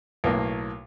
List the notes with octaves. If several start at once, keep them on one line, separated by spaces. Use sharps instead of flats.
B1 A2 A#3